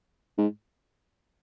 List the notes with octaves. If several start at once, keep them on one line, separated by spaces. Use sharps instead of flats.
G#2